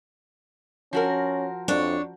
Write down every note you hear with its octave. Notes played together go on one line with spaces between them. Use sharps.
F3 C#4 F#4 A#4
F2 D4 C#5